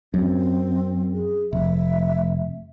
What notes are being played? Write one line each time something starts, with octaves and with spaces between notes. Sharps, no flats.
F#2 C4
G#4
F1 E5